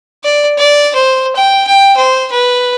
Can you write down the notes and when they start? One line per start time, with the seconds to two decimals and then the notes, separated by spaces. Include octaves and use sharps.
0.24 D5
0.58 D5
0.95 C5
1.36 G5
1.67 G5
1.97 C5
2.32 B4